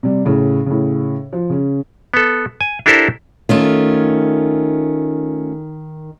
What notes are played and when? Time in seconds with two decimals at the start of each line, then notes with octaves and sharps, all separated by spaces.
0.03 C3 G3
0.25 A2 C#3
0.66 A2 C#3
1.33 F3
1.50 C#3 C#4
2.14 B3 A4
2.61 G#5
2.86 D4 E4 G4 A4 A#4 C5
3.49 D#3 A3 C#4 F4